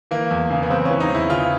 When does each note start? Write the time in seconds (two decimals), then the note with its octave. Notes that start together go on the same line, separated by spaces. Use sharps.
0.11 E3 A#3
0.31 E2
0.50 C#3
0.63 B3
0.70 E2 C4
0.85 C#4
0.90 E3
1.00 D#4
1.10 E2
1.15 E4
1.29 C#3 F4